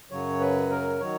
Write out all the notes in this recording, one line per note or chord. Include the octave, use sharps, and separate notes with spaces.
F#2 C#3 F#3 C#5
B4
A#4
D#3 F#3 C#5